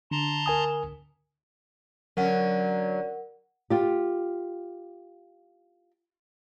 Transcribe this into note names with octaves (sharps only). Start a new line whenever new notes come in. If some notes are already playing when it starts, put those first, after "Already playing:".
D3 A5 A#5 C6
A#4 G#5 D#6
D3 F#3 C#4 A#4 F#5
F4 G4